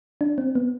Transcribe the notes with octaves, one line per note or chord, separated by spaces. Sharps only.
D4
C4
B3